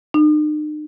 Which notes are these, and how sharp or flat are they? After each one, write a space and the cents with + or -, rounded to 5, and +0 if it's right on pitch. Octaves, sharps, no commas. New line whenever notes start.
D#4 -45